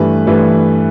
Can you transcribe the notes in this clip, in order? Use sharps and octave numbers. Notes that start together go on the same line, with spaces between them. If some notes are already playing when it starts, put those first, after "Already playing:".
Already playing: G2 E3 A3 B4
G2 E3 A3 B4